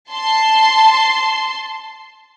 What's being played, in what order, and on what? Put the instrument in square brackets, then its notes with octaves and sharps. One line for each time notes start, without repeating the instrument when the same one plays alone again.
[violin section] A5 C6